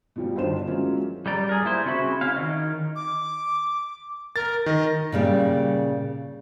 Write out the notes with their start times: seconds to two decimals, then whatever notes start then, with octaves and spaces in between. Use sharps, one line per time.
0.16 B2 F3 G3
0.36 G1 D#3 D4 C5 E7
0.67 E3 F#3 G#3 A#3 C#4 F4
1.26 G3 G4 D5 A#5
1.49 G#4 A#4
1.65 A#3 E4 C5
1.86 C#3 C4 F#4 E5 B5
2.21 C#4 E4 F5
2.35 D#3 D#5 F6
2.96 D6
4.36 A#4 A6
4.66 D#3 D#5
5.12 A#2 C#3 G3